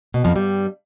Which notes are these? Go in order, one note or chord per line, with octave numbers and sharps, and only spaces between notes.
B2
F2 F3
G2 G3